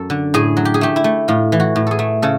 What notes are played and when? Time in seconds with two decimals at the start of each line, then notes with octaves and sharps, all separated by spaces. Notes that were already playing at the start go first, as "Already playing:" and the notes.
Already playing: F#2 A4
0.10 D3
0.34 A2 G#4
0.57 F#3
0.65 G4
0.74 G#4
0.81 A3 G4
0.96 E4
1.04 A3
1.28 A2 F4
1.52 E3
1.60 F#4
1.76 A2
1.87 G#4 A4
1.99 A3
2.22 C#3 A4